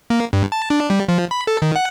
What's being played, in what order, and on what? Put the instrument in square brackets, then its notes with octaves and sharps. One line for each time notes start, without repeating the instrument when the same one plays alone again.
[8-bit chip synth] A#3
G2
A5
D4
G3
F3
B5
A4
D#3
F#5